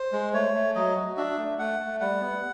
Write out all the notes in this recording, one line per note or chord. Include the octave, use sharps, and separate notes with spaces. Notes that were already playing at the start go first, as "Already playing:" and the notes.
Already playing: C5
G#3
A3 C#5
A3
F#3 D#5
F#4
D4 E5
A3
A3 F#5
A3
G3 F#5
B3